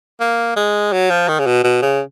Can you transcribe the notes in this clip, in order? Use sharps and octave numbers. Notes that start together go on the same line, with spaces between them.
A#3
G#3
F#3
F3
D#3
C#3
B2
B2
C#3